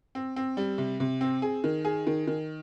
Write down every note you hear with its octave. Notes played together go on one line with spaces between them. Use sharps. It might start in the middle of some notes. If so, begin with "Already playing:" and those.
C4
C4
G3
C3
C3
C4
G#4
D#3
G#4
D#3
D#3